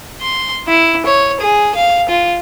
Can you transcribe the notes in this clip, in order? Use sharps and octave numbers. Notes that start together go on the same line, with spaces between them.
C6
E4
C#5
G#4
F5
F4